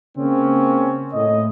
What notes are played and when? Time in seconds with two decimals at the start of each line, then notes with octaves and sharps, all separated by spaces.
0.16 C#3 A#3 C4 C#4
1.14 A2 D#5